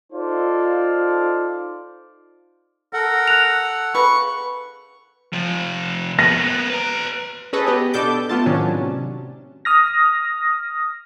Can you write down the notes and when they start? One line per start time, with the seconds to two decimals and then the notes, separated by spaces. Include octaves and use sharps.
0.13 D#4 F4 A4 C5 D5 F5
2.93 A4 A#4 F#5
3.28 F#6 F7
3.95 C#3 B4 C#6
5.33 C3 F3
6.19 A#3 B3 A#6
6.70 B4 A#5
7.53 C#4 G#4 A4 B4 D#5
7.66 B3 G4 D#5
7.93 B2 D4 A4 D6 G6
8.29 A3 B3 F4 A5
8.46 A2 C3 D#3 F#3 C#4 D4
9.65 D#6 F6 A#6